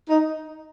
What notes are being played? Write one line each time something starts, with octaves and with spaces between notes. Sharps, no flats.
D#4